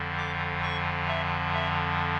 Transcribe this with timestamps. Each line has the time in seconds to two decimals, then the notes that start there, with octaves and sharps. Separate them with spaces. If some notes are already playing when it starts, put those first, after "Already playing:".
Already playing: F2 D3 F3
0.18 D6
0.63 C#6
1.08 E5
1.54 E5